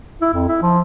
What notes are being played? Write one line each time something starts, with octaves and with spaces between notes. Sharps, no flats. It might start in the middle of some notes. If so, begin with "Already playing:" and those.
E4
F2
E4
F3